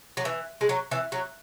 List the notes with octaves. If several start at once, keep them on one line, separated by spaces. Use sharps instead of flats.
F#3
E3
G#3
F#3
E3
F#3